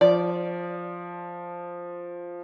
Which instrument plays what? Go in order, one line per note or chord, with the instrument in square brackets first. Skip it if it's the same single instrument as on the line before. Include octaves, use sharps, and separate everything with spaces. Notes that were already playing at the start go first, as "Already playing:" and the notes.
[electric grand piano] F3 [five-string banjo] D5